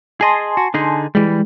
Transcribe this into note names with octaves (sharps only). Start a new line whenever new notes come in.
G#4 D#5 G#5 A5 C6
F#4
D3 D#4 G#4
E3 G3 G#3